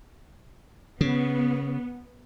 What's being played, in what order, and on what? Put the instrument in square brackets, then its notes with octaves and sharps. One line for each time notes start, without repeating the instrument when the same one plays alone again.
[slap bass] C#3 [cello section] B3